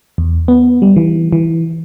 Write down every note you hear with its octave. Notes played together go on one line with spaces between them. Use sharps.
E2
B3
G3
E3
E3